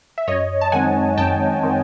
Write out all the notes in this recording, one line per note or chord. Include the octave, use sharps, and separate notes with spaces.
E5
F#2 C#5 D#5
A5
D#3 G#3 C4 F#5 G#5
F#2 G5 A5
D#3 G#3 C4